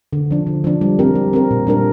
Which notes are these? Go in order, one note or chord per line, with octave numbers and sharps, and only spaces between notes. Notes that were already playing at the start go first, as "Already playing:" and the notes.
D3
F3 D4
D3
F3 D4
G3
C4 G4 A#4
G3
C4 G4 A#4
A#2
G3 D4 A#4